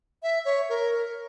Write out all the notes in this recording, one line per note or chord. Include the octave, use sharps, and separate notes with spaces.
E5
C#5
A#4